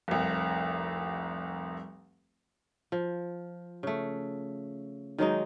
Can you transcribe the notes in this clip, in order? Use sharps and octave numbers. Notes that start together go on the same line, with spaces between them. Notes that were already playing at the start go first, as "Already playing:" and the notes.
F1 C2
F3
C#3 A3
D#3 F#3 G#3 D#4